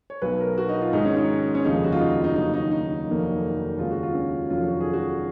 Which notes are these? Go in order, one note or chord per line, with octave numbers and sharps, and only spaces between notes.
C#5
B1 B2 F#3 B4
A#4
F#4
D#4
F4
G#2 D#3 G#3 D#4
C#4
D#4
C#4
F1 D#2 C#3 F3 G#3 D#4
F#4
F4
D#4
F4
D#4
D#2 C#3 F#3 D#4
D#4
D#4
F1 F2 D#3 F#3 A#3
D#2 C#3 G#3 C#4 F4
F#4
F4
C#4
F1 F2 D#3 F#3 C#4 F4
F#4
G#4
F#4